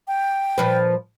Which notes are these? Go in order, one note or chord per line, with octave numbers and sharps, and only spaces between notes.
G5
A#2 F3 B4